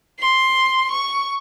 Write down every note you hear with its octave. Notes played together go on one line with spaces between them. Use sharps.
C6
C#6